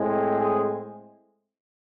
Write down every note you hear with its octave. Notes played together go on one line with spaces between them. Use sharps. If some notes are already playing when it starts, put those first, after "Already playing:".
Already playing: A2 G#3 C4
G#4